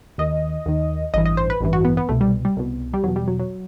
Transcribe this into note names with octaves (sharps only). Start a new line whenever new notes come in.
D#2 D#3 D#5
D#2 D#3
A1 G2 E3 D#5
D#5
C5
B4
A1 G2 E3
F#4
B3
B3
C2 B2 A3
G3
G3
C2 B2
G3
E2 B2 F#3
G3
F#3
F#3